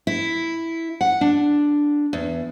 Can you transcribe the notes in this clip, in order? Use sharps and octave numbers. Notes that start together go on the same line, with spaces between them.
E4
F#5
D4
E2